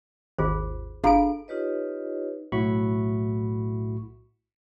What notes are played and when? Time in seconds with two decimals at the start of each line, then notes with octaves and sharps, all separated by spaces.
0.38 G#1 D#2 F4 G#4 C5
1.04 G1 D4 F4 G#4 A4 F5 A#5 D7
1.48 D#4 F4 G4 B4 C#5 D#5
2.52 B1 A2 E4 F#4 B5 C#6